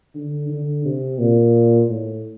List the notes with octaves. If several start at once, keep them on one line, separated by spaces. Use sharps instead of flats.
D3
D3
C3
A#2
A2